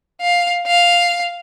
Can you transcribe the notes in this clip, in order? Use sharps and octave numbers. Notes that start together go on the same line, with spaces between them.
F5
F5